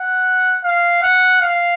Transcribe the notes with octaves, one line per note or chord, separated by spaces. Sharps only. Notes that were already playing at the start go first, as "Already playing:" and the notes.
Already playing: F#5
F5
F#5
F5